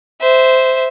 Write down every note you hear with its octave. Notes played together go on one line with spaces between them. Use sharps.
C5 E5